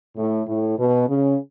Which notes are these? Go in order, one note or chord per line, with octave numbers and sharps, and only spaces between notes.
A2
A2
B2
C#3